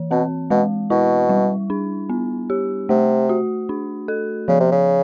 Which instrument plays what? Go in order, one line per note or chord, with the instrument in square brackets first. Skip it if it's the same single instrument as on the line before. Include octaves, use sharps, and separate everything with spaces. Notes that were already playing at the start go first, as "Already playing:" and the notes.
Already playing: [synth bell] E3
[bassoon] B2 [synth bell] C4
[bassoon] B2 [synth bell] G#3
[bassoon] B2 [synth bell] E4
[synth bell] G3
D4
B3
G4
[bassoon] C3 [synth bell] A3
[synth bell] F#4
D4
A4
[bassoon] C#3 [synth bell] F3
[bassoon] C3
C#3